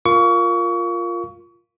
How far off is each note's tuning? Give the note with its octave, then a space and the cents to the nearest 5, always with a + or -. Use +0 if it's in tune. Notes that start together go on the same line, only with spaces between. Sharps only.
F4 +0 A#4 +0 C#6 +30